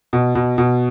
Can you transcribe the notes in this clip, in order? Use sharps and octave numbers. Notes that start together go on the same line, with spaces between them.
B2
B2
B2